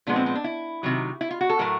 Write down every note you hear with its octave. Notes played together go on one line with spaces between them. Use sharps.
A#2 F3 G#3 B3 D4
C4
C4
D4
E4
C3 D#3 F#3
E4
F4
F#4
A4
A2 F#3 A3 A#4